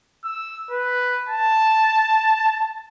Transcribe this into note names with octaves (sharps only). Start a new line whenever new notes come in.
E6
B4
A5